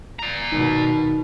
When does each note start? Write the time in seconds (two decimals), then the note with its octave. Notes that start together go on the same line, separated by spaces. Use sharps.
0.19 D5 A#5
0.52 B2 D#3